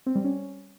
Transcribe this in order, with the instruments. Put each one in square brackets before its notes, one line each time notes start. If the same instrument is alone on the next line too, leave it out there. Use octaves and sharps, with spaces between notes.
[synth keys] C4
G3
C#4